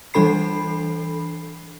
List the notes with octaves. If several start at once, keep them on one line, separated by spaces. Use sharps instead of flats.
E3 G3 D4 A4 B5 C7